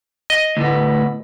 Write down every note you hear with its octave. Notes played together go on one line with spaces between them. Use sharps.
D#5
D2 A2 B3